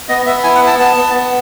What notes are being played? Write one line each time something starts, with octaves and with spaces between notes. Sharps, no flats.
B3 D#5
B3 E5
E4 G#5
F#5
B3
A5
B3 A5
B3
B3